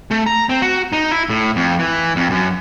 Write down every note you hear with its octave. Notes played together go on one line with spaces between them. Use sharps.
A3
A#5
C4
F#4
D#4
E4
A2
F2
E3
F2
F#2